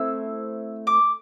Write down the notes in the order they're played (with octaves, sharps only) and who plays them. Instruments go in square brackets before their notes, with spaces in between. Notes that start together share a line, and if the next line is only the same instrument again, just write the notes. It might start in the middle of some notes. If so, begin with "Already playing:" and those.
Already playing: [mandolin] A3 C4 E4 E6
D6